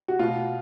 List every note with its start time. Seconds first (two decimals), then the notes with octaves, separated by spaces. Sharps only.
0.08 F#4
0.19 B2 F4